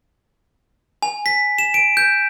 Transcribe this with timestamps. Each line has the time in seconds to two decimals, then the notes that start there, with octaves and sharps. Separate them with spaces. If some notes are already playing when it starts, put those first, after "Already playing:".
1.02 G#5
1.26 B6
1.58 E7
1.74 D7
1.97 G6